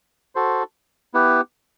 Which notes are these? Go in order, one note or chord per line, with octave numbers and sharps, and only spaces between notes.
F#4 A4 C5
B3 E4 G4 B4